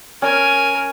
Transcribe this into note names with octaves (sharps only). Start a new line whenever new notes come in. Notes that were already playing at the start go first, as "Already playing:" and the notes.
C#4 A#4 G#5